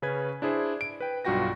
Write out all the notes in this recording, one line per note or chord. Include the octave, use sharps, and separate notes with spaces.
C#3 C#4 B4 G#6
D4 E4 G#4 C5
D7
B4 G5
B1 G2 F4 F#4 G5 A#6